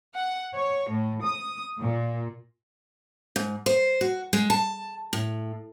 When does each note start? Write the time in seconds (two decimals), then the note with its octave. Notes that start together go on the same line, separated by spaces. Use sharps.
0.16 F#5
0.55 C#5
0.91 A2
1.22 D#6
1.81 A#2
3.36 G#2
3.66 C5
4.01 F#4
4.33 G#3
4.50 A5
5.13 A2